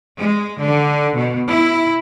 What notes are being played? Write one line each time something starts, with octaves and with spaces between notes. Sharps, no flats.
G#3
D3
B2
E4